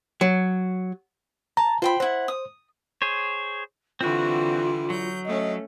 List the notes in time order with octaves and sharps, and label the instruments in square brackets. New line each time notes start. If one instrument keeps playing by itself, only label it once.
[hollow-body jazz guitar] F#3
[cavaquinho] A5 [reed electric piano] A#5
[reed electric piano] F4 [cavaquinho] C5 G5 B5
[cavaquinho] E4 F#5 [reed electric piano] C5
[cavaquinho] D#6
[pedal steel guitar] G#4 C5 C#5
[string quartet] D3 E3 G3 [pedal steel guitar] C4 F#4 [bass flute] F4
[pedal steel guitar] F#3 [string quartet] G6
[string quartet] A3 C#4 [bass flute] D#5